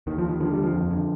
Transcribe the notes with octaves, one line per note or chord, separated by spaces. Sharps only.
D#2 D#3
F3
D#2
D#3
D3 F3
G3
D#2
F3
F2
D3